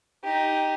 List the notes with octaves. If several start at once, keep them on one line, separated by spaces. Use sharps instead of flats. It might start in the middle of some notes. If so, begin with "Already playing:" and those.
D#4 G4